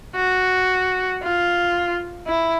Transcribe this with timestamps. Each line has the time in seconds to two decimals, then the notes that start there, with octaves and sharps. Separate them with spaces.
0.16 F#4
1.24 F4
2.27 E4